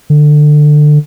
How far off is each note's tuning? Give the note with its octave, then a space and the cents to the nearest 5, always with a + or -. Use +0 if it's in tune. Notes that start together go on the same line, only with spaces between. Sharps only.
D3 +20